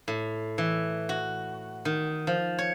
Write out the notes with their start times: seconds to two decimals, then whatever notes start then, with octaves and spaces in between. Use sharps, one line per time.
0.08 A2
0.58 E3
1.09 F#4
1.85 D#3
2.27 F3
2.58 C#5